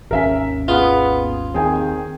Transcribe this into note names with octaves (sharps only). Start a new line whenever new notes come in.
G#1 D#2 C#4 A#4 E5 B6
B3 F4 G#4
D#2 D#3 C4 G#4 G5 G#5